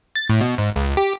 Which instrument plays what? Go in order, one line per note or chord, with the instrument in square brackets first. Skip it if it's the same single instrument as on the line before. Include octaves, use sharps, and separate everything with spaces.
[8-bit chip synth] A6
A2
B2
G#2
C#2
G4